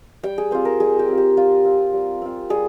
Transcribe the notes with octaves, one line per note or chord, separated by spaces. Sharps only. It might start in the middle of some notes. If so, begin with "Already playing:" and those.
G3 G5
G#4
C4 F4 C5
A#4
G3 G#4
G4
C4 F4
G4
G3 F4
C4 F4
G3
C4 F4
G3 G#4